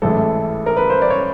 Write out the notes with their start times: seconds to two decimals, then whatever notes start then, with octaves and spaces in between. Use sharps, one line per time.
0.02 A1 G#2 E3 A4
0.66 A#4
0.77 B4
0.90 C5
1.02 D5
1.10 C#5